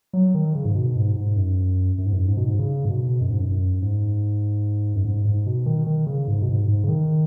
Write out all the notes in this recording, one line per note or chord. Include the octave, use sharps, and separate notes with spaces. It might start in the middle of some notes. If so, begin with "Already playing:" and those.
F#3
D#3
C#3
G#2
B2
G#2
G#2
F#2
F#2
G#2
F#2
G#2
B2
G#2
C#3
G#2
B2
F#2
G#2
F#2
F#2
G#2
F#2
G#2
G#2
B2
D#3
D#3
C#3
G#2
B2
G#2
G#2
C#3
D#3